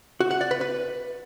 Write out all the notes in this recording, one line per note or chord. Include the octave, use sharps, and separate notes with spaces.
F#4
F#5
D5
B4
B4